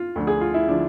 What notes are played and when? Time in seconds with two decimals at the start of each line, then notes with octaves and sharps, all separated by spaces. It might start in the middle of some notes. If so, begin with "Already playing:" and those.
Already playing: F4
0.16 D2 D3 F3
0.27 G#4
0.41 F4
0.54 E4
0.68 D3 F3 D4